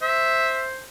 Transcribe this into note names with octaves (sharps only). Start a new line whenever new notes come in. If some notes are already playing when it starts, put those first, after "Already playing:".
C5 E5